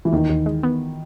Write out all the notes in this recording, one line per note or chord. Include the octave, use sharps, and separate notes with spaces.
E3
D#2 D#3
D#2
G#3
B3